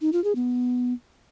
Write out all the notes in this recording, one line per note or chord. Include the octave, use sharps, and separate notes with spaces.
D#4
F4
G#4
B3